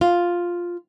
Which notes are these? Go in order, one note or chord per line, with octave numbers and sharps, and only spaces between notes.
F4